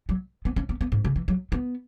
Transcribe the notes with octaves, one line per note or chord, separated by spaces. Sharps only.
F#3
B3
C#4
B3
B3
G#2
C#3
E3
F#3
B3